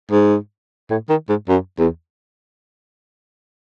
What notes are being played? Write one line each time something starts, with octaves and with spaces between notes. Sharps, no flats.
G#2
A2
D#3
G#2
F#2
E2